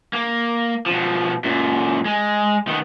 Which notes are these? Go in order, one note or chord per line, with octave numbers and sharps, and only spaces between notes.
A#3
B2 F3
F#2 A#2
G#3
D#3 B3